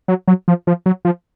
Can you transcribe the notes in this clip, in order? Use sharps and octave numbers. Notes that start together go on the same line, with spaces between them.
F#3
F#3
F3
F3
F#3
F3